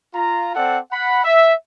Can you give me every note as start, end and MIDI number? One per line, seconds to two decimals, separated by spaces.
0.15 0.52 65
0.15 0.52 82
0.55 0.78 60
0.55 0.78 69
0.55 0.78 74
0.55 0.78 78
0.92 1.24 78
0.92 1.24 83
1.24 1.53 76